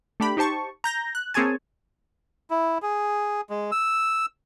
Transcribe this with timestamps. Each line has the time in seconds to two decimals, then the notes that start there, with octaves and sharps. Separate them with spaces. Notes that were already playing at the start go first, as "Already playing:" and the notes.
0.20 A3 D4 G4 B5
0.37 D#4 G4 C5 A5 C#6
0.84 A#5 G6 A#6
1.15 F#6
1.34 A#3 C4 G#4 C#5 G#5 A5
2.50 E4
2.82 G#4
3.50 G#3
3.72 E6